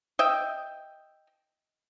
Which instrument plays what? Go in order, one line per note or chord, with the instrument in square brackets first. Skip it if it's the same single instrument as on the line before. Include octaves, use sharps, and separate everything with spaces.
[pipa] D#5 E5 G5